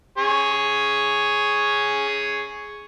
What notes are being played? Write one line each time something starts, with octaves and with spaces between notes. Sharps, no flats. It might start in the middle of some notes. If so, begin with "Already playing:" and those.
G#4 C#5